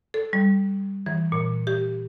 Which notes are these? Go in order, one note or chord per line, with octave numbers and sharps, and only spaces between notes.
A4
G3
E3
A#2
G4